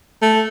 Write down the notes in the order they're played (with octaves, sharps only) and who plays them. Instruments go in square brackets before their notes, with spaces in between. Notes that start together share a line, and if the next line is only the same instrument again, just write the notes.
[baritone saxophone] A3